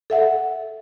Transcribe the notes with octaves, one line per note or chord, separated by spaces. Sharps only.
A4 E5 F#5